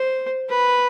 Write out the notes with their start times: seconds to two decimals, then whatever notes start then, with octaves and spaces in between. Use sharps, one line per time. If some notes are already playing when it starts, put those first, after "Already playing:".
Already playing: C5
0.49 B4